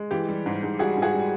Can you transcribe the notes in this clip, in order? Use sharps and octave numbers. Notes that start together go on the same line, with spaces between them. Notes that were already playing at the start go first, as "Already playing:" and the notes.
Already playing: G#3
E3 G4
G3
G#2
G#2
G3 F#4 G#4
G#2
F#4 G#4
G3